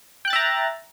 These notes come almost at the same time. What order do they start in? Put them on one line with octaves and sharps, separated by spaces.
G5 F#6 A6 E5 A#5